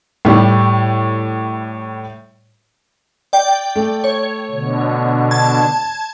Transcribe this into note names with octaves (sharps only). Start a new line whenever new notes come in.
A2 G3
D5 G5
A3
C#5
B2 D3
A5 G#6